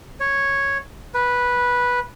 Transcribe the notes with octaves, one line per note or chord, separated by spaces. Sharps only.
C#5
B4